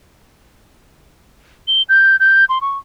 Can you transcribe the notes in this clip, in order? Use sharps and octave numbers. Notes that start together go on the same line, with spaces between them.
G7
G6
G6
C6
C#6